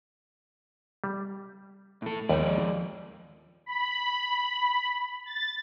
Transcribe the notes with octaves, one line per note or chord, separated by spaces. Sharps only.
G3
A2 A4
D#2 F3 G#3 D5 G5
B5
A6